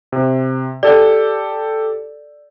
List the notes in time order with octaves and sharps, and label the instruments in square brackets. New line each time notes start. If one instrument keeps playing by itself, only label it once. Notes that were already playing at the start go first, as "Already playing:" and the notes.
[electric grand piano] C3
[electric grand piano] G4 A4 [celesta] D5